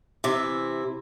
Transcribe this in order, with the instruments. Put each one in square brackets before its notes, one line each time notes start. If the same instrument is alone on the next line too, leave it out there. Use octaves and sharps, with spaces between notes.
[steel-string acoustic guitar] C3 E3 E4